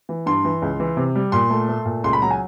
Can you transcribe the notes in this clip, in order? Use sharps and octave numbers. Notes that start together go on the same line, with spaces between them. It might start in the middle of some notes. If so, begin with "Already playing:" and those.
E3
G2 C6
E3
C#2
E3
C3
G3
A#2 C6
A3
A3
A#2
C#2 C6
B5
F#3 A#5
G#5